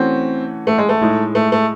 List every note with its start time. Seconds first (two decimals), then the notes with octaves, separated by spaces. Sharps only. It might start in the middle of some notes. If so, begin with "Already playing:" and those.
Already playing: E3 A3 C4 C#4 F#4
0.67 A3
0.78 G#3
0.89 A3
1.01 A2 G#3 D#4 G#4
1.35 A3
1.52 A3